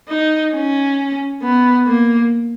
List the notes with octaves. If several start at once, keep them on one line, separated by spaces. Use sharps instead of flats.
D#4
C#4
B3
A#3